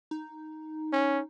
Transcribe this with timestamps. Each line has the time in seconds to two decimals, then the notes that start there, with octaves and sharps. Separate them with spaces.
0.11 D#4
0.93 C#4